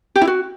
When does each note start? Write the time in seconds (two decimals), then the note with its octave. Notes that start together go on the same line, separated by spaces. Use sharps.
0.16 G4
0.21 E4
0.27 F#4